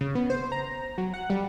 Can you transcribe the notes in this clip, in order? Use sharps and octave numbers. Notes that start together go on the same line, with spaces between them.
C#3
B3
C5
A#5
F#3
F#5
G3